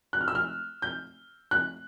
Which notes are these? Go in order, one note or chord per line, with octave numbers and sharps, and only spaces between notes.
F#6
F6
E6
F6
G6
F#6